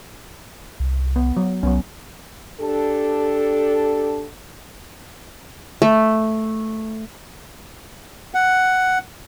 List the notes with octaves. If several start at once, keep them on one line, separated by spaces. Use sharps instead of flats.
C2
B3
F#3
C2 F#3 B3 C#4
D4 G4 A4
A3
F#5